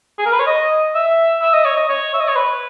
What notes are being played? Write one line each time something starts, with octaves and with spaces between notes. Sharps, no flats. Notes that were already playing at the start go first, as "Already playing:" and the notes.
G#4
A#4
B4
C#5
D#5
E5
E5
D#5
C#5
D#5
C#5
E5
D#5
C#5
B4